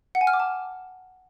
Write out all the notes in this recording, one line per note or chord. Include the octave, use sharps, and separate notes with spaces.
F#5
G#5
F6
D6
A5